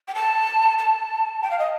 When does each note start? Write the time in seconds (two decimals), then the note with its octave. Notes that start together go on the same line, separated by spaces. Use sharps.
0.08 G5
0.15 A5
0.79 A5
1.42 G5
1.51 F5
1.59 D#5